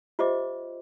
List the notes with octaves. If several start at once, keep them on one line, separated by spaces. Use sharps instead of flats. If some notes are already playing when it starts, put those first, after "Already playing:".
F4 G4 C5 D#5 E5 D6